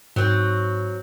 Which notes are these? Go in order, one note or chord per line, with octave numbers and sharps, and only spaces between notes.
G#2 F#3 C4